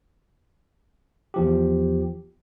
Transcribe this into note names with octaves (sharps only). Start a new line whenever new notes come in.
E2 F3 G4